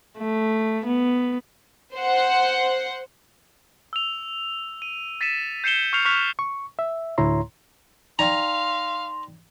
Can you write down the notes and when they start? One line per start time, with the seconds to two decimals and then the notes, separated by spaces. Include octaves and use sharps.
0.19 A3
0.86 B3
1.95 C5 F#5
3.93 E6 F7
4.82 D#7
5.21 A6 B6 C#7 D#7 E7
5.64 G6 C7 C#7 E7 G7
5.93 C#6 F6 G6 C7 C#7 F7
6.05 C#6 F6 F#6 B6 F7
6.39 C#6
6.79 E5
7.18 D2 A2 E4 C#5 A#5 C6
8.19 D#4 D5 F5 G5 A#5 C6